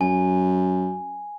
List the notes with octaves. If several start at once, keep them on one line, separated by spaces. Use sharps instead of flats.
F#2 G#5